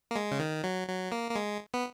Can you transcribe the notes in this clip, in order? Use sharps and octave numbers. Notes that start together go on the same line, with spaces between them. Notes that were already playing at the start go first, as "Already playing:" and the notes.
A#3
G#3
C#3
D#3
F#3
F#3
A#3
A#3
G#3
B3